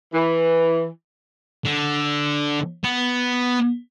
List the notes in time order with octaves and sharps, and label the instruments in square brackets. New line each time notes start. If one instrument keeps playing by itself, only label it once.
[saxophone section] E3
[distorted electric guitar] D3
B3